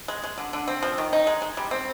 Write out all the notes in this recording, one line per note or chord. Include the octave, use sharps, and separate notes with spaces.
G#3
G#3
D3
D3
C4
F3
D#3
D#4
G#3
G#3
G3
C4